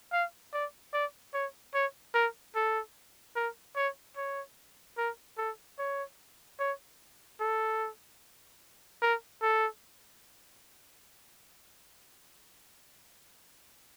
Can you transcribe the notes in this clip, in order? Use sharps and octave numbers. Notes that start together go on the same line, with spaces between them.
F5
D5
D5
C#5
C#5
A#4
A4
A#4
C#5
C#5
A#4
A4
C#5
C#5
A4
A#4
A4